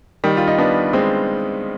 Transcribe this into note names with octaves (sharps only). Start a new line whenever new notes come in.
D#3 G3
F4
D#4
B3 D4
G#3 C4